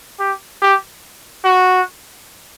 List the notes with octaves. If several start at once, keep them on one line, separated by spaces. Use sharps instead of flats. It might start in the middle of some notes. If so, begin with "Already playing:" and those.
G4
G4
F#4